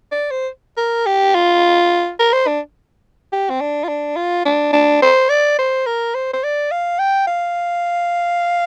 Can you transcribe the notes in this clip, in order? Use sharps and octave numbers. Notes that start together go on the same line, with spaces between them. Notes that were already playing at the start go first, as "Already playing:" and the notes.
D5
C5
A#4
G4
F4
A#4
C5
D4
G4
C4
D4
F4
D4
F4
D4
D4
C5
D5
C5
A#4
C5
C5
D5
F5
G5
F5